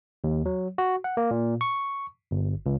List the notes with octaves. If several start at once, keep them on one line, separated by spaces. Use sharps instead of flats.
D#2
F#3
F#4
F#5
A#3
A#2
C#6
G1
C#2